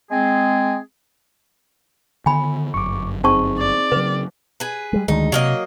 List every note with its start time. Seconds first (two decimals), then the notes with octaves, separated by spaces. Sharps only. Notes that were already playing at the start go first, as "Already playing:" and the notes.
0.11 G#3 C4 G#4
2.26 D3 D#3 B3 G#5 B5
2.74 G1 F#2 C#6 D6
3.24 C4 D#4 G#4 A5 C#6
3.58 D5
3.92 C#3 F#3 B4
4.60 G#4 B4
4.93 G3 G#3
5.08 D2 D#3 G#3 D#4
5.32 C3 F#3 A#3 D#5